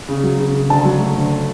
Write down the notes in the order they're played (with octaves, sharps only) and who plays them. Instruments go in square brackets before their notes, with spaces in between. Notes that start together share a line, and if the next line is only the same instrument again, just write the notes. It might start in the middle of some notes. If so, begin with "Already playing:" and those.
[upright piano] C#3
F#3
C#3
C#3
D2 A5
F#3
A3
D2